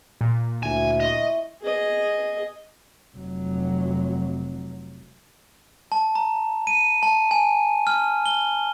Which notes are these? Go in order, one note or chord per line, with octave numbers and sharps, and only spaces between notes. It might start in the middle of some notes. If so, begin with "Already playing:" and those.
A#2
D2 E4 G#5
D#5 E5 C6 C#6
G#4 D#5
F1 F#3
A5
A#5
D#7
A5
G#5
F6
G7